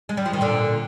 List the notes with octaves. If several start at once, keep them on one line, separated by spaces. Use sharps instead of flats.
G#3
G3
F3
D#3
A#2 D3